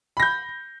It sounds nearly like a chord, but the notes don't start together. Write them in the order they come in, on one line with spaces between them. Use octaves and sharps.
B5 A#6 G6